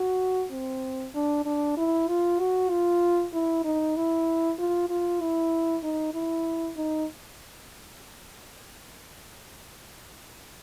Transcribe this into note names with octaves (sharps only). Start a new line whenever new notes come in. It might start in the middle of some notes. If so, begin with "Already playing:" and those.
Already playing: F#4
C4
D4
D4
E4
F4
F#4
F4
E4
D#4
E4
F4
F4
E4
D#4
E4
D#4